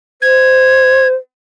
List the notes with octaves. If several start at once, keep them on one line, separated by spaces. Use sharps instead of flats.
C5 G#6